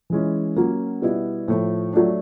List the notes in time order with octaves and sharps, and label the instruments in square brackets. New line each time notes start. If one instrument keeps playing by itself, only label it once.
[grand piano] E3 G#3 C#4 E4
F#3 A#3 C#4
B2 G3 B3 E4
A2 F3 A3
F#3 A3 D4